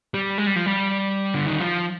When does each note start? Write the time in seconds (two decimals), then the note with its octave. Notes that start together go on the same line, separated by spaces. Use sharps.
0.14 G3
0.38 G#3
0.47 G3
0.56 F3
0.66 G3
1.34 D3
1.47 D#3
1.60 F3